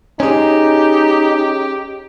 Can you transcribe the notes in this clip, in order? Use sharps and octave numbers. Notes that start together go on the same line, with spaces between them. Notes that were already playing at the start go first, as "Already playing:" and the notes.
C#4 D#4 G4 G#4